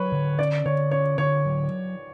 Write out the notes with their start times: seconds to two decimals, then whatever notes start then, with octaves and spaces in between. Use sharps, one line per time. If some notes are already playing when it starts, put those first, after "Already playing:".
Already playing: F#3 B4 C#5
0.12 D3
0.39 C#4 D5
0.66 D3 C#5
0.91 C#4 C#5
1.18 D3 C#5
1.45 F#3